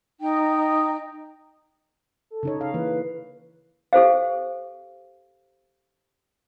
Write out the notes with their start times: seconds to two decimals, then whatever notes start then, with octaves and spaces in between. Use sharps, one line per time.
0.21 D#4 G5
2.30 A4
2.43 C#3 D#4 C#5
2.61 F5
2.74 E3 A#3 B4
3.93 G4 A4 C5 F5